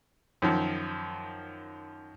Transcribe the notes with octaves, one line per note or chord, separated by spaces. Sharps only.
F#2 D#3 F3